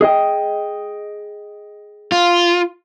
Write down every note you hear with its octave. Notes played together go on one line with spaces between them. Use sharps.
G#4 D#5 G5
F4